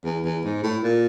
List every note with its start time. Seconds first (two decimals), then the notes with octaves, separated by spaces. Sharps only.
0.04 E2
0.24 E2
0.45 G#2
0.63 A2
0.84 A#2